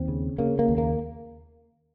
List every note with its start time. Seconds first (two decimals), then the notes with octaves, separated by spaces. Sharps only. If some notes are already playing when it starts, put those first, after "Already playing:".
Already playing: D#2 C4
0.08 C#3
0.38 C#3 A#3
0.59 A#3
0.68 D#2
0.78 A#3